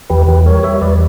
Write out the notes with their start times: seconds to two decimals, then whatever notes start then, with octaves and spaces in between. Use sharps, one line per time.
0.10 E2 G4 B4
0.28 E2 G4 B4
0.46 G3 A#4 C#5
0.63 G3 C#5 E5
0.81 E2 B4 D5